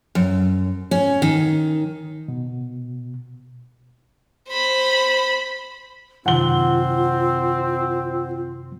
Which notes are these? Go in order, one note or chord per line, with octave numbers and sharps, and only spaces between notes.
F#2
C#4
D#3
B2
C5 B5
F#2 C3 D#3 C4 F4 F#5 G7